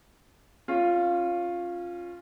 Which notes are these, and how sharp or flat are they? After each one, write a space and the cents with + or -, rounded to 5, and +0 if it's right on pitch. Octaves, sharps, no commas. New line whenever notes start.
C#4 -20 F4 +0